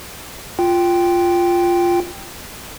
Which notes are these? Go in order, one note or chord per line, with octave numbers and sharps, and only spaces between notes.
F4 G5